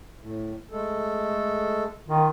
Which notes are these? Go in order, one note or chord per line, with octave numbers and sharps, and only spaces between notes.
A2
G#3 A3 A4
D#3 F4